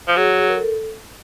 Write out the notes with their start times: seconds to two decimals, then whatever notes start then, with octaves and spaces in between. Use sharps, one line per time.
0.08 F3
0.17 F#3 G#4
0.48 A#4
0.55 A4